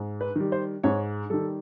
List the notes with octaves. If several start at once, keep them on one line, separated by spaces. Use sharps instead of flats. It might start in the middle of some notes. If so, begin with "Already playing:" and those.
Already playing: G#2
B4
D#3 G3
C5
G#2 C#5
D#3 G3 A4